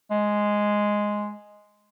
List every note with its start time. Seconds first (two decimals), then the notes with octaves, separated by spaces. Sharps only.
0.11 G#3